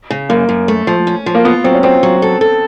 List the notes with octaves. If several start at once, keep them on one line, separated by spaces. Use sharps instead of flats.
C#3
F#2 A#3
F#2
A3
F3
C#4
F3
A#3
B3 F4
F#3 C4
C#4
C4 F4
F#3
A4
A4